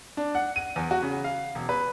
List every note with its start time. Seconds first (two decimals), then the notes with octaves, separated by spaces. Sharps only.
0.17 D4
0.35 F#5
0.56 D#7
0.76 E2
0.91 F#4
1.02 C#3
1.24 F5
1.55 E1
1.69 B4